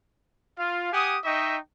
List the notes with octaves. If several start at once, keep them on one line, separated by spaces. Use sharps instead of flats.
F4 F5
G4 F#5 G#5 D#6
D#4 D#5 E5 G5 C#6